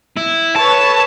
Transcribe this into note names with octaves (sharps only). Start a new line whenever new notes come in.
E4
A4 B4 C#5 A5